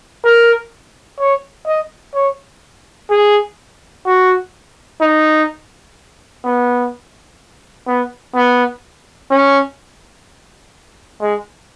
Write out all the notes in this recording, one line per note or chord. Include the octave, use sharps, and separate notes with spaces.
A#4
C#5
D#5
C#5
G#4
F#4
D#4
B3
B3
B3
C#4
G#3